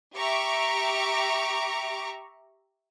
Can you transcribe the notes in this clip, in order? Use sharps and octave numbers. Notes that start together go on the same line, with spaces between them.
G4 E5 A#5 C#6 D6